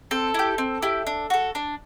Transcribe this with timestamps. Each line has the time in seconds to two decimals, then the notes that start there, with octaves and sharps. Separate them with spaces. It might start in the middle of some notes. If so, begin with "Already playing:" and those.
0.11 C4 A4
0.34 E4 G4
0.58 C4
0.82 E4 G4
1.07 D4
1.30 F#4 A4
1.55 D4